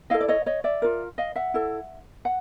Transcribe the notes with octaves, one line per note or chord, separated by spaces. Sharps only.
E4 A4 D#5 F5
D5
C#5 D#5
C#5 D#5
D5 E5
F4 A#4
D#5 F5
E5 F#5
E4 A4
F#5